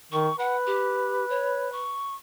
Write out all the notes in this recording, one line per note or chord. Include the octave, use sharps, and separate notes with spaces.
D#3 C#6
B4 F#5
G4
C#5
C#6